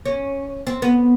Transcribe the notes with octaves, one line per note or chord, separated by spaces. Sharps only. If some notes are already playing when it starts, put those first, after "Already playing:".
C#4
C4
B3